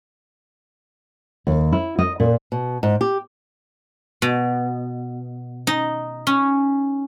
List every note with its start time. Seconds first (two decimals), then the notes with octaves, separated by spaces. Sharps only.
1.47 D#2
1.73 E4
1.99 D#5
2.20 A#2
2.52 B2
2.83 G#2
3.01 G4
4.22 B2
5.67 D#4
6.27 C#4